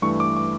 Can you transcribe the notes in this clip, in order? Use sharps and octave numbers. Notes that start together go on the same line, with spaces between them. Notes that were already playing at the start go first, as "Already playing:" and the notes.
G2 E3 A3 C#6
D6
D6